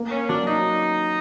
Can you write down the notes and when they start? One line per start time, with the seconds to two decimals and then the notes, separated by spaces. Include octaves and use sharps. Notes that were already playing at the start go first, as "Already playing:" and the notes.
Already playing: A#3
0.11 C#4
0.29 F#3 D4
0.47 D#4